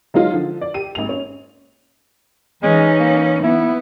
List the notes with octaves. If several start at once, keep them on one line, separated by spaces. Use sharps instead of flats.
F#3 G#3 D#4 F4
D3 F3
D5
G4 D#7
G#1 A#3 F7
C#4
E3 G#3 C#4 D#4
A#3
B3 E4